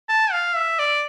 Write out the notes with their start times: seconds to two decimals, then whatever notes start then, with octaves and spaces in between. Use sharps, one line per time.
0.09 A5
0.32 F5
0.56 E5
0.79 D5